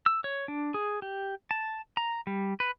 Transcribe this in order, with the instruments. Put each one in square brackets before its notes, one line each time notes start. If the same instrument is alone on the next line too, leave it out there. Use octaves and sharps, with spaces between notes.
[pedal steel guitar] E6
C#5
D4
G#4
G4
A5
A#5
G3
B4